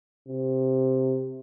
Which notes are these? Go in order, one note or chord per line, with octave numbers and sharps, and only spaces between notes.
C3